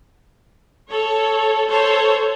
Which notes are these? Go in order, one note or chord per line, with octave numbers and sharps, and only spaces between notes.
A4 C#5
A4 C5 C#5